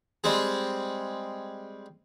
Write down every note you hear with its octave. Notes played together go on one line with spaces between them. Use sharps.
G3 G#3 C4 G#4